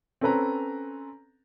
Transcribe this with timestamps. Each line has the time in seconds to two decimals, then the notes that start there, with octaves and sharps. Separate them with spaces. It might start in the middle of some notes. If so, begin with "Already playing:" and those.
0.21 C4 C#4 A4 B4 A#5